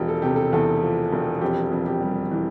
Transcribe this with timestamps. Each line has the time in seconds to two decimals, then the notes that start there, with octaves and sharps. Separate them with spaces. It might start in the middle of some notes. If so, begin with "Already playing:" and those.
Already playing: E1 F3 G4
0.08 A4
0.22 C3 G4
0.36 A4
0.53 E2 A4
0.83 F3
1.12 E1
1.41 F2 G4
1.71 F2
1.86 G4
2.01 G3
2.31 E3